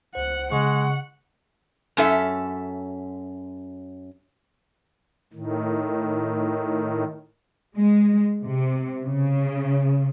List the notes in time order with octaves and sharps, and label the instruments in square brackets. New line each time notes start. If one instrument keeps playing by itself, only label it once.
[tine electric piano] C#2 C5 [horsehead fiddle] F#5
[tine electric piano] C#3 C#6 [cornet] G#3 [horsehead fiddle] F#5
[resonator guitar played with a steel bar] F#2 C#4 A4 E5
[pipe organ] A2 D#3
[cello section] G#3
C3
C#3